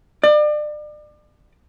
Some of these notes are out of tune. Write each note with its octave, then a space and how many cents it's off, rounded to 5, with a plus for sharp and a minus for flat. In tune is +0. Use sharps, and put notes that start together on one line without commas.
D5 +35